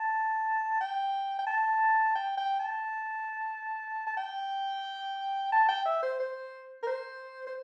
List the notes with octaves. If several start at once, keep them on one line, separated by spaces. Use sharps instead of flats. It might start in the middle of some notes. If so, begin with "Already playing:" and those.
Already playing: A5
G5
G5
A5
G5
G5
A5
A5
G5
A5
G5
E5
C5
C5
A#4
C5
C5